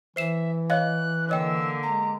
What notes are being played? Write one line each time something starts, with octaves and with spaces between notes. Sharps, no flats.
E3 C5 E5 C7 E7
C#5 D#5 F5 F#6
D3 A#3 C#5 D#5 G5 E6
G#3 A#5